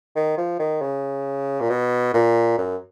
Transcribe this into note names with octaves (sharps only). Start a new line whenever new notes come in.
D#3
F3
D#3
C#3
A#2
B2
A#2
F#2